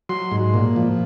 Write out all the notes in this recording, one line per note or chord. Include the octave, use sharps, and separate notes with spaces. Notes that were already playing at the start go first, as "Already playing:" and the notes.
F#3 C6
G#2
A#2
F3